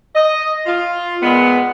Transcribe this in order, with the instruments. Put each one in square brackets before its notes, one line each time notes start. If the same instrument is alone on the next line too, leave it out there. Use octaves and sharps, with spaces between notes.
[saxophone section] D#5
F4
A#2 G#3 B3